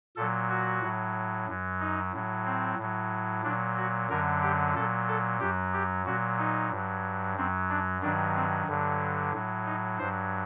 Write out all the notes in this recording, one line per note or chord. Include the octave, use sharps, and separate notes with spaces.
A#2 F#3 A4
F#4
A2 F#3
F#2 F#3
D#4
A2 F#3
C4
A2 F#3
A#2 F#3 D4
F#4
F#2 D3 F#3 A#4
G4
A#2 F#3 A4
A4
F#2 F#3 G4
G4
A#2 F#3 F#4
D#4
G2 F#3
F#2 F#3 C4
D4
G2 D#3 F#3 D4
C4
G2 D3 F#3
A2 F#3
D#4
G2 F#3 C5